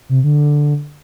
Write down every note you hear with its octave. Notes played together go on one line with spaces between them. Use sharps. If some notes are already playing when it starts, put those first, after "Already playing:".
C3
D3